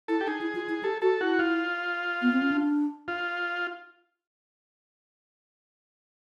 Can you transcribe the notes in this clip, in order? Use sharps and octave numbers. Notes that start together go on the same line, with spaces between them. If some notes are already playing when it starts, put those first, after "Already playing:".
E4 A4
G4
D#4 G#4
E4
F4
E4
G4 A4
F#4 A4
E4 F#4
F4
B3
C4
C#4
D4
F4